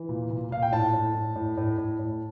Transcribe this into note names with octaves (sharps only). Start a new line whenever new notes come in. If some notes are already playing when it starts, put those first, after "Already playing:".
Already playing: E3
A#2
A#2
A#2 F5
G5
A2 A5
A2
A2
A2
A2
A2
A2